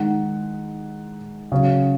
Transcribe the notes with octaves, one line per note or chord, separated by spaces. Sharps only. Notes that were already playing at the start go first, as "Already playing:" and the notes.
Already playing: D#3 G#3 D#4 F#5
C#3 F#3 C#4